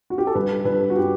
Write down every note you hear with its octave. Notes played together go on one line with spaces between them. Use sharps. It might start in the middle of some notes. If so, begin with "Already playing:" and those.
F#4
G4
A4
G2 B4
G2 B4
F#4
G4